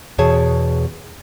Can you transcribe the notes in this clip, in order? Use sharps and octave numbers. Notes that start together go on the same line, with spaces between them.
E2 B2 G#4 C#5 A5